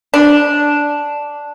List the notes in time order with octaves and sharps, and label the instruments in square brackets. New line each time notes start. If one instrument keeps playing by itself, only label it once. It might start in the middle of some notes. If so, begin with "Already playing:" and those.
[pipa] D4